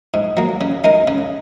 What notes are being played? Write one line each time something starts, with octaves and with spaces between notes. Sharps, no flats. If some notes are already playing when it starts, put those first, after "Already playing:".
G#2
F#3 A#3
C#3
G#3 D#4 A#4
C#3